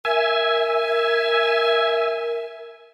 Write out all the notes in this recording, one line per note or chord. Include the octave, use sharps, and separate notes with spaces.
A#4 E5 G#5